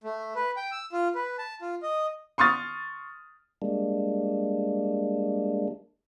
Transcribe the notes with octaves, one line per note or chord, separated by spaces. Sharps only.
A3
B4
G5
E6
F4
B4
A5
F4
D#5
C6 C#6 D#6 F6 A6
G3 G#3 A#3 D4